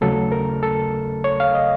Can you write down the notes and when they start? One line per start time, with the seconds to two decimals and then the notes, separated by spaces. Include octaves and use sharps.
0.01 D#2 C#3 F#3 A3 A4
0.32 A#4
0.63 A4
1.24 C#5
1.40 F5
1.54 D#5